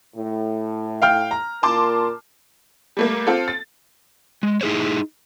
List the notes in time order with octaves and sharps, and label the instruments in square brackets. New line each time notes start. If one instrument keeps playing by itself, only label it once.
[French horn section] A2
[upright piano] F5 G5 F6
A#5
[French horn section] A#2 A#4 [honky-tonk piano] A5 C6 D6
[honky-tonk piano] G3 A3 A#3
C4 F4 A4
A6
[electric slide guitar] G#3
D#4 E4 G#4 C5 C#5